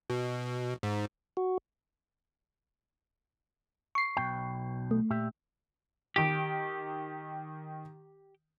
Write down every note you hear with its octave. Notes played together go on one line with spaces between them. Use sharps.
B2
G#2
F#4
C#6 C7
B1 B2 G5
A3
A#2 G4 E5
D#3 G4 D7